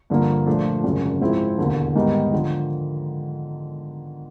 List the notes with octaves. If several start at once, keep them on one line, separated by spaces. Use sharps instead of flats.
G2 D3 F3 A#3
A#1 A#2 F3 A3 D4
G#1 F#2 C#3
G#2 F3 G#3 C4 E4
E1 D#2 D3
G#2 D#3 G3 B3 D#4
D3 F3